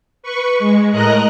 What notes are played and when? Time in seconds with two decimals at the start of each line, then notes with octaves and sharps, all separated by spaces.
0.23 B4 C#6
0.59 G#3
0.91 A2 A#4 D#5 A#5 F#6